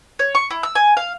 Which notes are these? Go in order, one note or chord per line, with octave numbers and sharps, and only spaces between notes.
C#5
C#6
E4
E6
G#5
F5